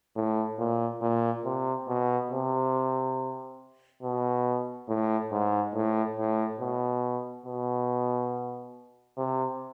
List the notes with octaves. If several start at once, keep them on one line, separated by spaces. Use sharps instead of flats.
A2
A#2
A#2
C3
B2
C3
B2
A2
G#2
A2
A2
B2
B2
C3